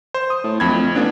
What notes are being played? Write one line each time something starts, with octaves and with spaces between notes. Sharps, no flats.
C5
D#6
A2
D1 F2 B5 G#6
A1 B3 D4